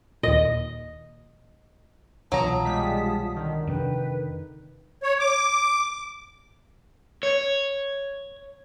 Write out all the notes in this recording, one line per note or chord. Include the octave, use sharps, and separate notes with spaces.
D#2 A#2 D#5
C2 B2 E3 F#3 F4 A5 A#5 D#6
G3 G#3 B6
D3 D#3
F2 C3 D4 B4 G5
C#5
D6
C#5